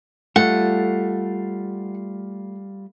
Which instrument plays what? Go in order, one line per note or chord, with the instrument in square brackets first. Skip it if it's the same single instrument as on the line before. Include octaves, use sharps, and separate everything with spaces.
[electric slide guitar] G3 F4 [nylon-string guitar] A3 [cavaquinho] F#5